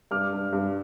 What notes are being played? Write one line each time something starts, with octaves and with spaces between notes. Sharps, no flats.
G2 D6 F6
G2
G2